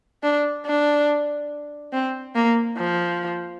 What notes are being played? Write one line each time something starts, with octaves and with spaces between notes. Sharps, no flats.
D4
D4
C4
A#3
F3